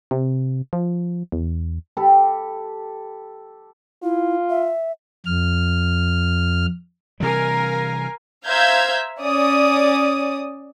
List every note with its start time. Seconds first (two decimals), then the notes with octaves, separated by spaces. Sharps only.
0.11 C3
0.73 F3
1.32 E2
1.97 G4 A4 B5
4.03 E4 F4
4.50 E5
5.26 F2 F6
7.20 C3 E3 G3 A#4 F5 G#5
8.46 C5 E5 F5 A#5 G6 G#6
9.20 C#4 D5 D#6